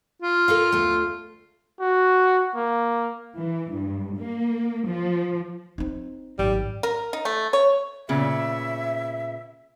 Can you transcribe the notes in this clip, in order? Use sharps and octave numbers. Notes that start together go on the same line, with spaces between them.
F4
A4 A#4 F5
D2 A3
F#4
A#3
E3
G2
A#3
F3
C4 D#4
G#1 F#3 G3
A#4
D#4
A3
C#5
A#2 C#3 B3 E5